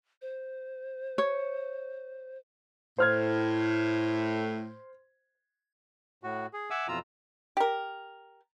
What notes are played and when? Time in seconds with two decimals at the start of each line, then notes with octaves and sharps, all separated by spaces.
0.22 C5
1.18 C#5
2.98 A2 C5 F6 G#6
6.23 A2 F#4
6.53 G#4
6.70 E5 F#5 G#5 D6 E6
6.88 F2 B2 E3 F4 A#5 E6
7.57 G4 A#4